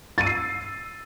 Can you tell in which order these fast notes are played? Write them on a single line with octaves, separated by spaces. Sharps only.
A6 D#7 E6 C7